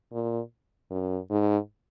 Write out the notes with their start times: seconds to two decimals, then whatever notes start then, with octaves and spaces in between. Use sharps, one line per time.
0.13 A#2
0.91 F#2
1.30 G#2